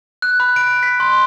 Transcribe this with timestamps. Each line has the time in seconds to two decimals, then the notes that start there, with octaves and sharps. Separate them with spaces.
0.22 F#6
0.40 B5
0.56 D7
0.83 B6
1.00 C6